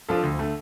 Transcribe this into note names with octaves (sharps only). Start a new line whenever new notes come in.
F3 D4 F4 A4
D2
D3 A3